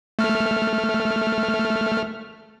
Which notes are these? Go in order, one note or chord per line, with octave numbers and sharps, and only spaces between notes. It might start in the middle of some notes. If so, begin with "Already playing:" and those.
A3 F6